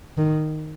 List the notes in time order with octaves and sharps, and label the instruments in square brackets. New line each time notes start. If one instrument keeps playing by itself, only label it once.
[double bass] D#3